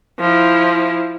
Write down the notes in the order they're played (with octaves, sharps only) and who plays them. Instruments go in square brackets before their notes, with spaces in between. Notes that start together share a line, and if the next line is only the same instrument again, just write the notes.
[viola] F3 E4